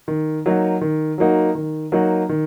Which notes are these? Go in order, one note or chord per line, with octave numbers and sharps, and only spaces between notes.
D#3
F#3 A#3 D#4 F#4
D#3
F#3 A#3 D#4 F#4
D#3
F#3 A#3 D#4 F#4
D#3